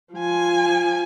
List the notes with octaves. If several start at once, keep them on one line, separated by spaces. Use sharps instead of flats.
F3 G#5